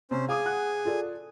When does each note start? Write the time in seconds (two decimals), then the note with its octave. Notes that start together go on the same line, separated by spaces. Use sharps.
0.11 C3 C#4 C5
0.28 G#4 F5 G#5 D6 D#6
0.45 F#5 F#6
0.85 F4 A4 D5